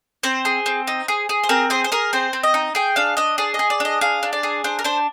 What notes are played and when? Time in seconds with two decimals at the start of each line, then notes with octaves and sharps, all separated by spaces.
0.23 C4 C5
0.45 G#4
0.66 C4
0.87 D#4
1.08 G#4
1.29 G#4
1.43 C5
1.49 C4 A#4
1.70 G#4 C5
1.84 C5
1.92 G#4 A#4
2.13 C4 C5
2.33 C4
2.44 D#5
2.54 D#4
2.75 G#4 G5
2.96 D4 F5
3.17 D4 D#5
3.38 G#4 D5
3.54 G#4 D#5
3.70 D5
3.80 D4 D#5
4.01 G#4 F5
4.23 D4
4.33 D5
4.43 G#4
4.64 D4 C5
4.79 A#4
4.84 D4 C5